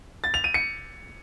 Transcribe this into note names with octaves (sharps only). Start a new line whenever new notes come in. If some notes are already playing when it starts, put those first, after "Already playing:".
A6
F7
D#7
C#7